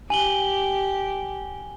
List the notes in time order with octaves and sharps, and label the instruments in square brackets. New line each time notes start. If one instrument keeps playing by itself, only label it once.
[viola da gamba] G4 [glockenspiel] G#5 F#7 G7